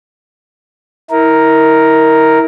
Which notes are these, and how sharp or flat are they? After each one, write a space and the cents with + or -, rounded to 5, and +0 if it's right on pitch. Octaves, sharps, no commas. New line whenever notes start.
E4 -35 A#4 +0